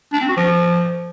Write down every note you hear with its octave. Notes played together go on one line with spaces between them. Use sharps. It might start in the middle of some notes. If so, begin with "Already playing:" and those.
D4
C4
F#4
F3